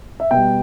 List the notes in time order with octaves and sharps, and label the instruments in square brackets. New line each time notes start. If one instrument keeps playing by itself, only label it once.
[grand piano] E5
B2 G3 G5